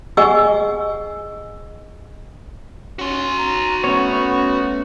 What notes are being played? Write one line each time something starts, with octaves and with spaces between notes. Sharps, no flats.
G#4 D#5 F#5 G#5 C#6 E6
C#4 F#4 C6
A#5
A3 B3 C#4 C#5